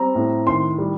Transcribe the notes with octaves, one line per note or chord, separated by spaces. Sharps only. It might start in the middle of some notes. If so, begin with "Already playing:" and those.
Already playing: G3 C4 A#5
A2
D#3 C6
G3